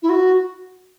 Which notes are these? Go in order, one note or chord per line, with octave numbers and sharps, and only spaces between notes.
E4
F#4